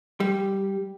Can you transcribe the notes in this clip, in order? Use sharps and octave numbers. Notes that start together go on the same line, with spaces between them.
G3